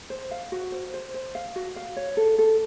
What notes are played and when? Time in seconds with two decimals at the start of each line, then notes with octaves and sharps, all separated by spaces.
0.10 C5
0.31 F5
0.52 F#4
0.72 C5
0.94 C5
1.14 C5
1.35 F5
1.56 F#4
1.76 F5
1.96 C#5
2.17 A4
2.38 A4